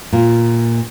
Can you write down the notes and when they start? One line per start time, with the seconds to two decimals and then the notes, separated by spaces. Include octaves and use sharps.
0.13 A#2